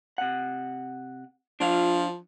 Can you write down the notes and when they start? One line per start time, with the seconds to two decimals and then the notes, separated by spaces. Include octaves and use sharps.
0.18 C3 F#5
1.60 F3 D4 F4 F5